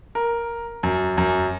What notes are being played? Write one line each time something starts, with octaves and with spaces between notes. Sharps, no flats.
A#4
F#2
F#2